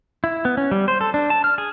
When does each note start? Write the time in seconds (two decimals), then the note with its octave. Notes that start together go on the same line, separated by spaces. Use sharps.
0.24 E4
0.45 B3
0.57 C#4
0.71 G3
0.88 C5
1.01 A4
1.14 D4
1.30 A5
1.44 F6
1.58 G#4